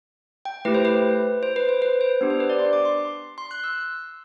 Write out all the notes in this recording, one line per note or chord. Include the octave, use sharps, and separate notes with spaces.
G5
A3 E4 G4 B4
C5
B4
C5
B4
C5
B4
C5
B3 D4 G4
C5
B4
D5
C6
D6
C6
C6
F#6
E6